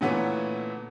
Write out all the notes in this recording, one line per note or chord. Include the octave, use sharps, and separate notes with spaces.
A#2 D3 E3 A3 B3 C#4